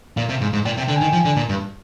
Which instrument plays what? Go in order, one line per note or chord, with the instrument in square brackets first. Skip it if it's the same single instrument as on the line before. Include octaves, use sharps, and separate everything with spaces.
[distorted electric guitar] A#2 [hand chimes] F5
[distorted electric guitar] C3
G#2
G#2
[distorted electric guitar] A#2 [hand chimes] G5
[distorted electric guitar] C3
[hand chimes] G5
[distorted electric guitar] D3
[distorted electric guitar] D#3 [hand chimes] G#5
[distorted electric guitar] F3
D3
A#2
G2